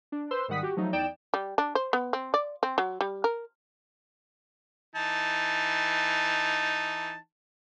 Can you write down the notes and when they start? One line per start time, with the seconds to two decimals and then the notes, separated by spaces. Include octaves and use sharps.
0.12 D4
0.31 B4 C5 C6 E6
0.48 G#2 D#3 G3 F#5 D#6 B6
0.63 F#4 G4
0.77 F3 F#3 A3 D#4
0.93 E2 D#4 D5 G5 D7 E7
1.34 G3
1.58 D4
1.75 C5
1.93 B3
2.13 C4
2.34 D5
2.63 C4
2.78 F#3
3.01 G3
3.24 A#4
4.96 E3 D#4 A5